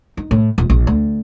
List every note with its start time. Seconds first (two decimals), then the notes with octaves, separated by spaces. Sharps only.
0.17 D#4
0.31 A2
0.58 D#1
0.70 A#1
0.87 D2